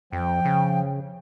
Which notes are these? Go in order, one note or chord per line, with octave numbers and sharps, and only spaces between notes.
F2 F3 G5
C#3